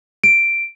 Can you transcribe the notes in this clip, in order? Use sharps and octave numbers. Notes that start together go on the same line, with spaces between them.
D7